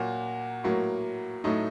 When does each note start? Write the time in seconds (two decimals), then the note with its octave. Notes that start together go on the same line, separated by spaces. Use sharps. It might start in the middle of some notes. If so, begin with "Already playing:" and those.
Already playing: A#2 F#3 A#3 F#4
0.64 A2 F#3 A#3
1.44 A2 F#3 A3 D#4